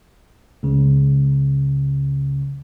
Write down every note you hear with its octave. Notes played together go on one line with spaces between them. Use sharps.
C#2 C#3